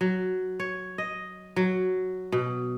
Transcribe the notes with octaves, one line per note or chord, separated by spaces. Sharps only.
F#3
C#5
D#5
F#3
B2